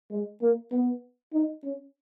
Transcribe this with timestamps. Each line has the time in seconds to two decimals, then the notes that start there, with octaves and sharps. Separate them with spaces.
0.11 G#3
0.41 A#3
0.71 B3
1.33 D#4
1.63 C#4